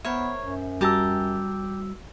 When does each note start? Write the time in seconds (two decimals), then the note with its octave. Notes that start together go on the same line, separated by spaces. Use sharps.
0.05 B3 A#4 C5 C#5 E5
0.44 F#2
0.81 G3 F#4 G4 A5 A#5 E6